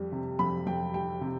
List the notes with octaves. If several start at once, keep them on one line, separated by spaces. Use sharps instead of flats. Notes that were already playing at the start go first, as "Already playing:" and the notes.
Already playing: F2 G3
C3
F2 B5
F2 G5
G3 G5
C3